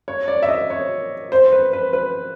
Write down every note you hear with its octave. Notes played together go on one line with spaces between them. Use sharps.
C#5
D5
E5
D#5
C#5
C5
B4
B4
B4